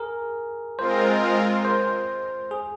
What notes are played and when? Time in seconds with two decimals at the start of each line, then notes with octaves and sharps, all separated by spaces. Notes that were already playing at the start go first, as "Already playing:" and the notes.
Already playing: G#4 A#4
0.78 G#3 C4 F4 A#4 C5
1.65 C5
2.51 G#4